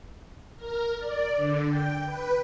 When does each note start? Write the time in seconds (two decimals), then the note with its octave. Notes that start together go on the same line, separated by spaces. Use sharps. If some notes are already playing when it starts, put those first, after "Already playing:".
0.56 A#4
0.98 D5
1.35 D3
1.68 G5
2.06 B4